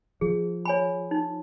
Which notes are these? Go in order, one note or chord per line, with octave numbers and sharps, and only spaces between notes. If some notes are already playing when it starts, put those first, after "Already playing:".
F3 G#4
C#5 G#5 B5
D#4